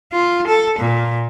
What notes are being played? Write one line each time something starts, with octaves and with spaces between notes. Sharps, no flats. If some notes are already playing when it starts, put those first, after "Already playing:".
F4
A4
A#2